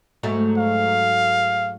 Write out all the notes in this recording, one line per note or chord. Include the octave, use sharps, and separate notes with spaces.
G#2 F#3 A3
F5